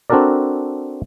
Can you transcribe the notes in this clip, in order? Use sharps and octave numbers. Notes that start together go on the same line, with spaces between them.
C4 D4 F#4 A4 A#4 D5